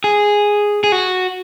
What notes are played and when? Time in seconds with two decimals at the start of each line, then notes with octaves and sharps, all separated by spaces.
0.04 G#4
0.84 G#4
0.92 F#4